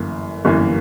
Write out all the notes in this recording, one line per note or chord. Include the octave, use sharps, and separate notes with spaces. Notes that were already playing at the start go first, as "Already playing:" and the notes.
Already playing: G1 F#2 E3 A#3
G1 F#2 E3 A#3